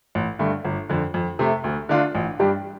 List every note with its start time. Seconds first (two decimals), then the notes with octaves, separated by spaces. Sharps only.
0.15 A1
0.39 G2 D3 A3
0.64 G1
0.89 F2 D3
1.14 F2
1.39 C3 A3
1.64 D2
1.89 D3 A3 D4 F4
2.15 A1
2.39 G2 G3 D4 G4